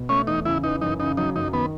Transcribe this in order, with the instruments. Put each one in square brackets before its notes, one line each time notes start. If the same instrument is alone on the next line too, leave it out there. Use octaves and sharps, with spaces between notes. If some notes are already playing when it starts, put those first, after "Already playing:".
Already playing: [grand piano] B2
[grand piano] A3 [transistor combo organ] C#4
[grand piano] E2 [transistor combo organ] D#4
[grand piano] C#3 [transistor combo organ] E4
[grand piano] E3 [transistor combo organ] D#4
[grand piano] F#2 [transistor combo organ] D#4
[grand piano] C#3 [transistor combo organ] D#4
[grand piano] F#3 [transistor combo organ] D#4
[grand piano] F#2 [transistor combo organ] D#4
[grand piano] D#3 [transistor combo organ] B3